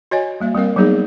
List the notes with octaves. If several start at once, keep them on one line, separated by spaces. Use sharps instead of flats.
F#4 C#5 D#5 G#5
G3 A#3 E5
G3 C4 A#4 F5
F#3 G3 A#3 B3 D#4 G#4